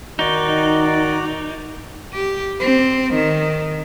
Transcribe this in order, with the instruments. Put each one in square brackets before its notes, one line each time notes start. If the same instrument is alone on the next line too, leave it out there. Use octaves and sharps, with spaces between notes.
[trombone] D#3 [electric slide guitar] D#4 [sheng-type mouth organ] F#4 D5
[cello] G4
C4
D#3